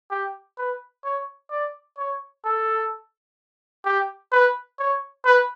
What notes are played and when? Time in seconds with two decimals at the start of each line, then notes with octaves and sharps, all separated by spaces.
0.10 G4
0.57 B4
1.05 C#5
1.51 D5
1.98 C#5
2.45 A4
3.85 G4
4.32 B4
4.79 C#5
5.25 B4